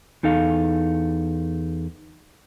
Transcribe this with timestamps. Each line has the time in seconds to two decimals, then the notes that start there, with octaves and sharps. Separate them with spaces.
0.23 E2 D#4 A4 F5